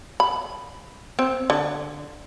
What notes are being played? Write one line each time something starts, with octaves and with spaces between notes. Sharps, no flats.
B5
C4
D3